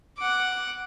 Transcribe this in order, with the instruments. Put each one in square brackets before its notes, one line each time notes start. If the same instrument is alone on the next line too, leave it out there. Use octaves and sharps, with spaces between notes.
[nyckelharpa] F#5 D6